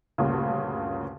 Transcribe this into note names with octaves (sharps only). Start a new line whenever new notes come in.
D2 G2 A#2 C#3